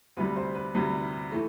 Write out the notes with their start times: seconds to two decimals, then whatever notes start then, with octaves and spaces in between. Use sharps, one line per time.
0.17 D2 C3 G3 B4
0.36 C5
0.55 B4
0.74 D2 C3 G3 B4
1.32 E3 A3